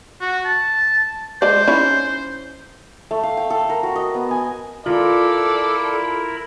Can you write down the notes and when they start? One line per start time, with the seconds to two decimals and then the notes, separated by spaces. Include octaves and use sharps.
0.22 F#4
0.45 A5
1.42 G#3 C5 D5
1.68 C#4 D#4 E4
3.11 A3
3.23 F5
3.37 G5
3.50 A4
3.70 A#4
3.83 F#4
3.96 D#5
4.14 B3
4.31 G#5
4.86 E4 F4 A4 A#4 D5 B5